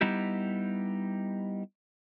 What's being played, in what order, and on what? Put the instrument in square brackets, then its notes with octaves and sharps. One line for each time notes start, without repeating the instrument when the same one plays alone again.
[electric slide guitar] G3 B3 D#4 E4 G4